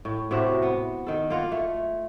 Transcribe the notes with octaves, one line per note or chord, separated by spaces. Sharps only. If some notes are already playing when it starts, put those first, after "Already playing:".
A2
A2 C3 F#4 E5
B3
D#3 A4
A#3 F4 F#5
A3